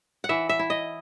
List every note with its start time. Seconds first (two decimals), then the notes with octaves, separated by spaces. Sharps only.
0.24 F#5
0.29 E3 E5
0.49 E5
0.59 E4
0.70 D#5